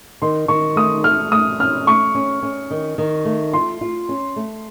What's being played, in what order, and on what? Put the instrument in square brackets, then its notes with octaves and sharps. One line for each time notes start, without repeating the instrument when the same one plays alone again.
[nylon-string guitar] D#3 [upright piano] C6
[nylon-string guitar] D#3 [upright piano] C#6
[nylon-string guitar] A3 [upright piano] D#6
[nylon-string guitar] A3 [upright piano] F6
[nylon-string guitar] A3 [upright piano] D#6
[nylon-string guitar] C#4 [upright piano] F6
[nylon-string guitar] A3 [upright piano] C#6
[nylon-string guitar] C#4
C#4
D#3
D#3
A3
[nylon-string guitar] F4 [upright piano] C6
[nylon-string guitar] F4
C#4
A3